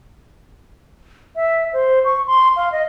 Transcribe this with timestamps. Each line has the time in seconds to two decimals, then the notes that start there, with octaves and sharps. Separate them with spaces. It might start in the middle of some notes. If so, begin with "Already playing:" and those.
1.36 E5
1.73 C5
2.05 C#6
2.27 C6
2.56 F5
2.72 D#5